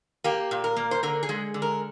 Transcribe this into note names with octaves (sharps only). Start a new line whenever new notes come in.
A#3 G4
A#2
A#4
A#3
C5
D3 A#4
G#4
G#3
D3
A#4